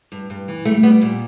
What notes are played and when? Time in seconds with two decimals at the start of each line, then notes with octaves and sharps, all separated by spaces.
0.12 G2
0.30 G2
0.48 E3
0.65 G3 A3
0.83 G3 B3
1.01 A#2